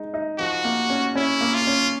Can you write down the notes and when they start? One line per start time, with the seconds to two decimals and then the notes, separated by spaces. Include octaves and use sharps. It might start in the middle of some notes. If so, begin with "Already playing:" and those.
Already playing: G#3 D#4
0.14 D#4
0.39 F3 F#4
0.64 A#3
0.90 C#4
1.16 C#4 E4
1.41 A#3
1.54 F4
1.67 C#4